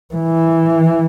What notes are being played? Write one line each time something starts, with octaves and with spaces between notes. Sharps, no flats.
E3